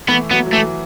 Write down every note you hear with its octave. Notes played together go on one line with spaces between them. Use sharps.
E3 A3 B3
F#3 B3
F#3
E3 A3